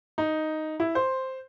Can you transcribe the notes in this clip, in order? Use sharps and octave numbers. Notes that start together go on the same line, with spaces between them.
D#4
E4
C5